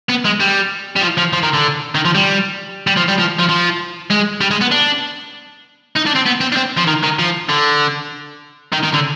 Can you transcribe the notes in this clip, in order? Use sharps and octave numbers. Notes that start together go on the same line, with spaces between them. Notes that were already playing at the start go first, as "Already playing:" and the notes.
B3
G#3
G3
G3
F3
F3
F3
D#3
D3
D#3
F3
G3
G3
F3
G3
F3
F3
F3
G#3
G3
G#3
B3
D4
D#4
D4
C4
B3
C4
D4
C4
F3
D#3
D#3
F3
D3
D#3
D#3
D3